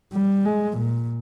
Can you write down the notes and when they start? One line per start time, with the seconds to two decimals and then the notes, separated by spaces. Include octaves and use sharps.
0.13 G3
0.45 G#3
0.79 A#2